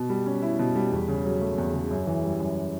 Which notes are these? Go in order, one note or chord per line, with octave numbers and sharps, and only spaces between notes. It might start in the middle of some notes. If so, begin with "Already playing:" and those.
Already playing: B2
G3
C#4
E4
B2
G3
E2
C#3
F#3
A3
E2
C#3
F#2
E3
G3
F#2